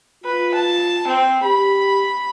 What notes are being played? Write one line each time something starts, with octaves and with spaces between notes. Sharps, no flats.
F4 B4
A5
C4
G4 B5